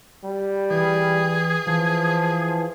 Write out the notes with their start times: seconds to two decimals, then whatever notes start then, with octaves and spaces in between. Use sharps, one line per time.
0.24 G3
0.70 E3 G#4
1.67 E3 F3